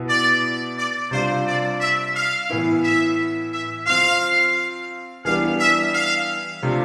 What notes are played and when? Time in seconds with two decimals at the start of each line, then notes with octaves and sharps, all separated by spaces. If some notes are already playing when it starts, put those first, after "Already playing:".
Already playing: B2 B3 E4
0.09 D5
0.78 D5
1.11 C3 G3 D4 F4 C5
1.46 D5
1.80 E5
2.15 F5
2.50 A2 E3 B3 E4
2.83 E5
3.53 E5
3.87 F3 C4 F4 F5
5.25 E3 G3 B3 D4 G4 F5
5.59 E5
5.93 F5
6.62 C3 F3 A3 D4 G4